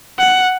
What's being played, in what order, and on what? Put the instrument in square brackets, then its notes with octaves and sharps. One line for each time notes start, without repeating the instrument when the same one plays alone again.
[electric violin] F#5